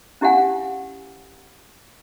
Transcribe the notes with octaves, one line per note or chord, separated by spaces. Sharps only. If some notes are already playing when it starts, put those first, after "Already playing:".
C#4 E4 G4 F5 F#5 G#5